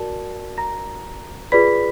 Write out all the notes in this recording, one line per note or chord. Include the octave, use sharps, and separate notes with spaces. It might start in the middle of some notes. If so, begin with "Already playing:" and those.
Already playing: F#4 A#4 D5 A5
A#5 A#6
F4 G#4 B4 D5 B5 B6